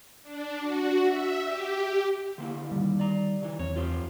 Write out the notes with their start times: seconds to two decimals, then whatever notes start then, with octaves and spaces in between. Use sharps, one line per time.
0.23 D4
0.60 F#4
1.04 E5
1.44 G4
2.38 D3 A#3 E4
2.72 D#3 G3
3.00 D5 A#5
3.42 C#3 E3
3.59 E2 C4 C#5
3.76 F4 G4 C5